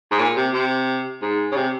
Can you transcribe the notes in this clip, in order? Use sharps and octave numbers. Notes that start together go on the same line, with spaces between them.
G#2
A#2
C3
C3
G#2
C#3
C3